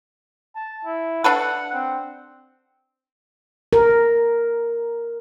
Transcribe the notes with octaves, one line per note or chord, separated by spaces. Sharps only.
A5
E4
D4 A4 B4 F#5
C4
A#4